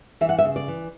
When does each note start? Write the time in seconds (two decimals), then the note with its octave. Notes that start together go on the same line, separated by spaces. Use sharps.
0.21 E3 E5
0.29 F#5
0.39 E5
0.44 C#3
0.56 D5
0.68 E3